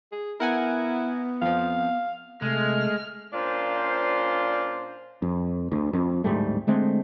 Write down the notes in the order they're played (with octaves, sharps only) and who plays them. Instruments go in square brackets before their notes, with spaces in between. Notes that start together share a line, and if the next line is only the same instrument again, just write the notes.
[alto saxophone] G#4
[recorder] B3 [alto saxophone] E4 [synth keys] A#4 F#5 G#5
[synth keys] F2 F3 [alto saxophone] F5
[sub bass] C3 [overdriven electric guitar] G#3 [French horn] A3 [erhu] F6
[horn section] A#2 C#4 D4 F4 C5
[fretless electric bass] F2
D2
F2
D1 G#2 G3 A3
D3 G#3 A3 C4